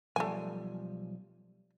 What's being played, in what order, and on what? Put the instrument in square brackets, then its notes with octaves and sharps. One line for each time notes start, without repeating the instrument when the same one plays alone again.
[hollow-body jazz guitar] B1 F3 G3 [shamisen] A3 G#5